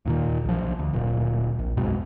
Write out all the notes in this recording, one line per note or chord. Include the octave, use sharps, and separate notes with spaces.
D#2 A#2 D#3
B1 F3
D2
D1 A#2
A#1
B1 F2 G#2 B2